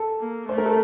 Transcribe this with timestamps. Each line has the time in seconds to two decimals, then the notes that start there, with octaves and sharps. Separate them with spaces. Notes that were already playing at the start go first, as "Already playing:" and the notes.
Already playing: A4
0.21 A#3
0.49 A3 C5
0.58 A#4
0.65 A4